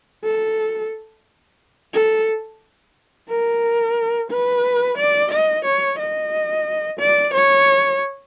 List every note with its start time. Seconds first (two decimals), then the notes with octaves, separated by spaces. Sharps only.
0.24 A4
1.94 A4
3.29 A#4
4.31 B4
4.98 D5
5.31 D#5
5.65 C#5
5.99 D#5
7.00 D5
7.34 C#5